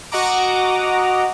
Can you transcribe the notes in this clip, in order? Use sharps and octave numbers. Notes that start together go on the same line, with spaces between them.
F#4 D#5 F#5 A#5 D6